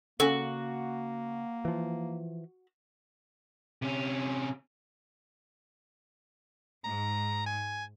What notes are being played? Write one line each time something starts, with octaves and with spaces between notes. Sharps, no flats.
C#3 A#3 C#4 F#4 A4
E3 F3
C3 C#4
G#2 A#5
G#5